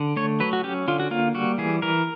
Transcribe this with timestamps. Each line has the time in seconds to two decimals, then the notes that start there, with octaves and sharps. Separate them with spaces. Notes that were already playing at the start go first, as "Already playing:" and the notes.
Already playing: D3
0.16 A3 C#5
0.40 F#3 B4
0.53 F#4
0.64 C#4 G4
0.88 D3 F4
1.00 F#4
1.11 A#3 F4
1.35 G3 F#4
1.58 E3 G#4
1.82 E3 A#4